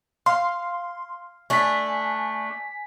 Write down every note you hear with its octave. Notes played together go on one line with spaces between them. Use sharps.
F5 C6
A3 D4 G#5 B6